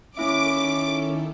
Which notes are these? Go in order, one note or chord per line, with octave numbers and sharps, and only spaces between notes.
D#3 A#3 C#4 D#4 E4 A4 E5 D6